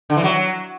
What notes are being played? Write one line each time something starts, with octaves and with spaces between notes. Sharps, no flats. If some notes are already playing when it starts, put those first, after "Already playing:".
D3
E3
F#3